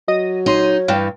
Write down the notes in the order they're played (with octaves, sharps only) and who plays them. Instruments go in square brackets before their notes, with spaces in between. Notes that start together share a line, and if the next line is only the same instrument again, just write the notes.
[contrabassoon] F#3 [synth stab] D#5 A#6 D#7
[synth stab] A#1 C6 D#7 [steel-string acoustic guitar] D#4 [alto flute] C#5
[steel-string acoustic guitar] G2 E3 [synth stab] F5 G5